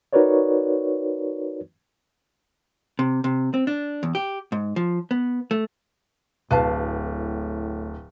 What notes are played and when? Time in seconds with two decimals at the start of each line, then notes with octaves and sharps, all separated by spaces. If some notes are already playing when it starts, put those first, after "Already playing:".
0.13 D#4 F#4 A#4 B4 C#5 D5
2.99 C3
3.24 C3
3.54 C4
3.67 D4
4.03 E2
4.15 G4
4.52 G#2
4.76 F3
5.11 B3
5.51 A3
6.51 D1 A2 B4 F5 A5